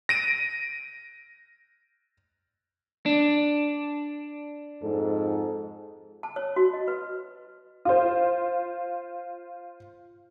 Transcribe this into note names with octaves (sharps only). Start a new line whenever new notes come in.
A#6 D7 D#7
D4
F2 G#2 A4
A5
C#5
F#4
D#5
B4
F4 C5